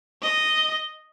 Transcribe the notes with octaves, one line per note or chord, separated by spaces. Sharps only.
D#5